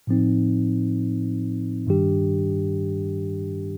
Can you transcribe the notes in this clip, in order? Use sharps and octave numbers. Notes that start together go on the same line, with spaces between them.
A2 F3 C4 D#4
G2 D#3 G3 D4 G4